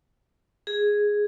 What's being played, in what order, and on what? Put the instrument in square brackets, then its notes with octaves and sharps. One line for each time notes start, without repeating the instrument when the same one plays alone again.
[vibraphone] G#4